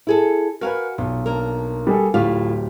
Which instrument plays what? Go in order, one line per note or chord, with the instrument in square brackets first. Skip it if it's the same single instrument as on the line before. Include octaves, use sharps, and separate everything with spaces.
[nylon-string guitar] E4 G#4 A4
[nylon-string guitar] F#4 F5 G#5 [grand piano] A#4 B4
[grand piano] B1 [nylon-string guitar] A#2
[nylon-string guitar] A#3 D4 A#4
[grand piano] G3 G#4 A4
[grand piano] D1 G4 [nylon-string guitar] A2 F4 F5